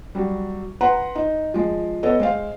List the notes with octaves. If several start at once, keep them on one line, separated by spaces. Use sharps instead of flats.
F#3 G3
B4 F#5 A#5 C6
D#4
F3 G#3
B3 A4 C#5 D#5
G#3 C5 F5